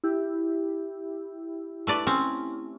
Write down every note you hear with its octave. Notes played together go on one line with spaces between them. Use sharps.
E4 G4
A3 B4 D5
C4 C#4